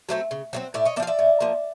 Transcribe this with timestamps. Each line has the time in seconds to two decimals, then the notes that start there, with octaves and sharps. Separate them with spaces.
0.09 F#3 A3 C4
0.31 C#3
0.53 F#3 A3 C4
0.74 A2 D5 E5
0.85 C#5 D#5
0.96 A#3 D5 E5
1.00 F3 F5
1.07 D5 E5
1.19 A2
1.40 F3 A#3